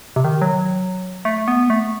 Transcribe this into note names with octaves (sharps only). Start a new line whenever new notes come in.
C3
D#3
F#3
A3
B3
A3